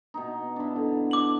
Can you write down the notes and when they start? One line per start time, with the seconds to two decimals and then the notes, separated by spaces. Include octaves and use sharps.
0.14 B2 D#4
0.56 D4 E4
0.76 D3
1.11 D4 D6 F#7